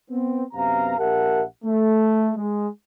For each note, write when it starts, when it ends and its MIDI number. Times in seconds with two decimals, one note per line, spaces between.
0.11 0.45 59
0.11 0.45 60
0.54 0.98 42
0.54 0.98 48
0.54 0.98 59
0.54 0.98 77
0.54 0.98 82
0.98 1.44 34
0.98 1.44 67
0.98 1.44 70
0.98 1.44 76
0.98 1.44 78
0.98 1.44 81
1.65 2.32 57
2.37 2.68 56